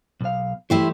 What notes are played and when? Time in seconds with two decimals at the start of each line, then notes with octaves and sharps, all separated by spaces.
0.21 B1 F5
0.70 E3 G3 A3 E4 G4 C5